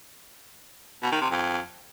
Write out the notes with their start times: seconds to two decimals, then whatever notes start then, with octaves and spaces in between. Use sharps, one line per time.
1.03 B2
1.12 D#3
1.21 C3
1.30 F2